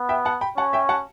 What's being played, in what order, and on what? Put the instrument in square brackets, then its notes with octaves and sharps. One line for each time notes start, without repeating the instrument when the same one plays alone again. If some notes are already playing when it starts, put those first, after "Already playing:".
Already playing: [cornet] B3
[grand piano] E5 G5
F#5 A5
G5 B5
[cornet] C#4 [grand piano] F#5 A5
[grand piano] E5 G5
F#5 A5